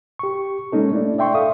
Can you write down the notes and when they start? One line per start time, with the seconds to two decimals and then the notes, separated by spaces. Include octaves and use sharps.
0.19 G4 C#6
0.72 G#3 A#3 C#4 D#4 A4
0.92 A3 D4 E4 D5
1.18 D5 E5 G5 C6 C#6
1.34 A4 E5 F5 D#6